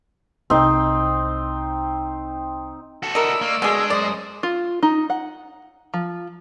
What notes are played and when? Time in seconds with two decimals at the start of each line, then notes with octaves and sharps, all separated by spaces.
0.50 C2 C4 D#4 C5
3.03 F#4 A4
3.15 D4 E4 A#4 D#5 E6
3.41 A3 A#3 D5
3.62 B2 G#3 G#4
3.78 D4
3.90 F#2 C5 D5 D#6
4.43 F4
4.83 D#4
5.10 F#5
5.94 F3